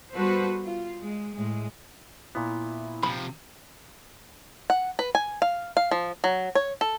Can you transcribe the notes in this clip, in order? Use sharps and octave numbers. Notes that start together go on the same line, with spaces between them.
G3 B3 F#4 A4 B4 C5
F4
G#3
A2 G#3
A#2 B3 E4
C3 F3 G#3 B5
F#5
B4
G#5
F5
F5
F3
F#3
C#5
A4